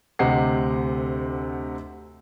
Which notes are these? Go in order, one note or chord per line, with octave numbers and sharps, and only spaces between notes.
D2 C3 G4 D#5 F#5 C7